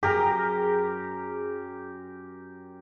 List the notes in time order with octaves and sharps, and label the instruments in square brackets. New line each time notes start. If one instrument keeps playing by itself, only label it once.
[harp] F#2 [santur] G4 A#4 A#5 [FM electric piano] G#4